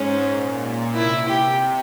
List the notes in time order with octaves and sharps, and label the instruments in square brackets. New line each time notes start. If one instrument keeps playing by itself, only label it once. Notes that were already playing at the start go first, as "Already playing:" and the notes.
Already playing: [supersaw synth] G#2 [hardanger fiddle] C#4
[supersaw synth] A#2
[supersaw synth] C3 [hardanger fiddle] E4
[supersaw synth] C3 [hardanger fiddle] G4